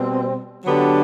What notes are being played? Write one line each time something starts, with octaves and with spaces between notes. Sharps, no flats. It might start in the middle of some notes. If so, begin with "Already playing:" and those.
Already playing: B2 G3 C4
D3 F#3 B3 D4 G4